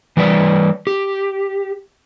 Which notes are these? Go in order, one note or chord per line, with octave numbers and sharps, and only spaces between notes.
E3 G3 B4 D5
G4